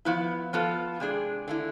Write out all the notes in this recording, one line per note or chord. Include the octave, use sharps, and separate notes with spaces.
F3 B3 E4
F3 B3 F4 A4
C3 G#3 D4 G#4
D3 A3 E4